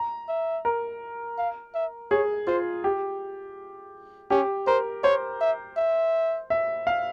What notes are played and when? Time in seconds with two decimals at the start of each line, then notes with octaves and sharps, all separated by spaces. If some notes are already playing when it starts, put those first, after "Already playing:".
Already playing: A#5
0.28 E5
0.65 A#4
1.38 F5
1.75 E5
2.11 G#4 C#5
2.47 F4 C5
2.84 G4
4.30 C#4 G4
4.67 A#4 C5
5.04 C5 C#5
5.41 E5
5.77 E5
6.50 E5
6.87 F5